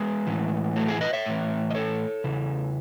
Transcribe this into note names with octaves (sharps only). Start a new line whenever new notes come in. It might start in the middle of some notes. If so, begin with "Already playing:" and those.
Already playing: G#3 B3
A2 E3
F#3 A3
E4 G#4
B4 D#5
C#5 E5
A2 E3
D#5
A4 C#5
E2 C#3 E3